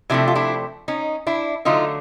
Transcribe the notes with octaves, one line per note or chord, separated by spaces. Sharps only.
C3 F3 A3 D4 E4
F4
D4 E4
C#4 D#4
D4 E4
D3 F#3 A3 D#4 F4